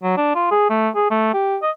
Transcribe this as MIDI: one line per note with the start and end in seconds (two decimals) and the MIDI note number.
0.03 0.17 54
0.17 0.34 62
0.35 0.48 65
0.51 0.69 68
0.69 0.89 57
0.95 1.09 68
1.10 1.32 57
1.33 1.56 67
1.62 1.70 75